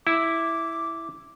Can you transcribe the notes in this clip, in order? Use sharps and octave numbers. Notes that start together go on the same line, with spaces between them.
E4 D6